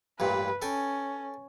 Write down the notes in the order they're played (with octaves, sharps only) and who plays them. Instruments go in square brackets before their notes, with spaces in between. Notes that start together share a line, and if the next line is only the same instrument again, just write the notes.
[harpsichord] A1 G2 A#2 [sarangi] B4
[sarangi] C#4 [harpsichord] A4 G5 G#5